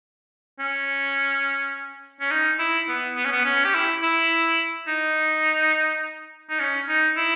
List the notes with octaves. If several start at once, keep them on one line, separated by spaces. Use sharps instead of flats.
C#4
C#4
D#4
E4
B3
B3
C#4
B3
C#4
G4
E4
E4
D#4
D#4
C#4
D#4
E4